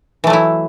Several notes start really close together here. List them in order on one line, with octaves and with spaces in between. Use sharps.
E3 A3 F#3 E4